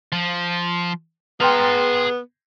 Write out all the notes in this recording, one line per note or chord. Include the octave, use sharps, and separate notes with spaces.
F3
B3 G#4 G5 A#5 C6 F6